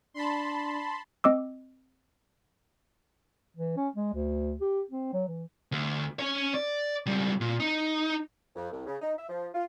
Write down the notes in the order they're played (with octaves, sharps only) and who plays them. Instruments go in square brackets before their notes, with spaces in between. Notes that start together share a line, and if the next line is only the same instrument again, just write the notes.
[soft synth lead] D4 [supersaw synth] A5 B5 C6
[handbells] C4 D#5 D6 E6
[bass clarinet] E3
C#4
G#3
D2
G4
C4
F#3
E3
[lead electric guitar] D2
C#4 C#5
D5
C#2 G3
A#2
D#4
[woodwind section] F2
C2
C#3
D#4
E5
F3
F4